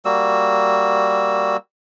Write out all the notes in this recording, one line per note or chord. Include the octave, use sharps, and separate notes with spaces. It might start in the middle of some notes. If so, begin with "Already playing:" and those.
G3 A#3 F#4 E6